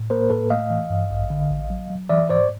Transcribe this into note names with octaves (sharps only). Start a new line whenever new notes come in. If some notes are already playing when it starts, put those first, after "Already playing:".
Already playing: A2
A#3 A#4 C5
A2 A4 B4
A3 D#5 F5
E3
G2
A1
D3
A1
F#3
F#3
E3 D5 E5
G#2 C5 D5